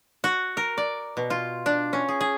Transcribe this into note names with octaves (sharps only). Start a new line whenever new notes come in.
F#4
A#4
D5
B2
F4
D4
C#4
G#4
G#4